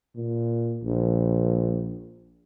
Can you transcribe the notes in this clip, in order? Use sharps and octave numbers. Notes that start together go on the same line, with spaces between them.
A#2
A#1